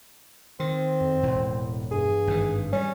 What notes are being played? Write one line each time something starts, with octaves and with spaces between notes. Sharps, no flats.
D#3 C4
F2
E1 A2
G2 G#4
G#1 G#2 E3
G3 C#4